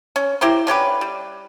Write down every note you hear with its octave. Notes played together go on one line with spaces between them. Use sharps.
C#4
E4 G4 A#4 C5
D3 C#4 G4 B4
G3